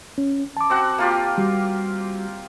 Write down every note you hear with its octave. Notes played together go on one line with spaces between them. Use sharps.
C#4
A5 D6
C4 F#4 F#5
A#3 F4 G4
G3 F#4